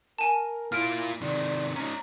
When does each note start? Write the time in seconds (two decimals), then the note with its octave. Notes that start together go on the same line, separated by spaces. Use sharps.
0.18 A#4 G#5 A5
0.72 A#3 E4 F4 F6 D7
1.21 C3 D#3 D5
1.76 C#4 D#4 A#5